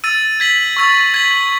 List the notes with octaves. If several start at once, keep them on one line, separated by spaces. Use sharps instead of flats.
E6 A6 D#7
G#6 B6 F#7
C#6 E6 A6
G#6 B6 F#7